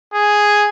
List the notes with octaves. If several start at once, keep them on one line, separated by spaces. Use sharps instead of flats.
G#4